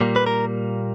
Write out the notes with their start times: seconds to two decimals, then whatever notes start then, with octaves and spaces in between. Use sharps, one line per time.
0.01 A#2 G3 A#3
0.16 B4
0.26 A#4